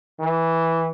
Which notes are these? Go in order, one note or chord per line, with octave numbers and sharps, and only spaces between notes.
E3